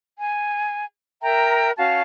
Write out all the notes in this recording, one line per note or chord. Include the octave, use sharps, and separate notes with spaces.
G#5
A#4 E5 G5 A#5
C#4 F#4 F5 A5